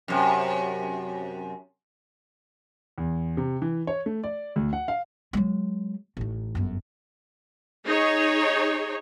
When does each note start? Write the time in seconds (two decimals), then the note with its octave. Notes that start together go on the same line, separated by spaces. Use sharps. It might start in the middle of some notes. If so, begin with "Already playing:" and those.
0.08 F#2 C3
2.98 E2
3.37 C3
3.62 E3
3.87 C#5
4.06 A3
4.24 D5
4.56 D2
4.73 F#5
4.88 F5
5.33 F#3 G#3
6.17 A1 D#4
6.55 G1 F#2
7.86 D#4 G#4 C#5